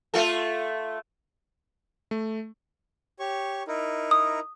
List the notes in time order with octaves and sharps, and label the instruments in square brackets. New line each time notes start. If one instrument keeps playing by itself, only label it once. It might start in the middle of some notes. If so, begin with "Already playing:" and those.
[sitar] A3 F4 A4
[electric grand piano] A3
[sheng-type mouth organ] G4 C#5 C#6
D#4 E4 A#4
[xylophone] D#6